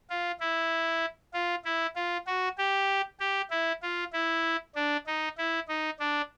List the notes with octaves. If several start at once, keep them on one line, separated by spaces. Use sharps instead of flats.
F4
E4
F4
E4
F4
F#4
G4
G4
E4
F4
E4
D4
D#4
E4
D#4
D4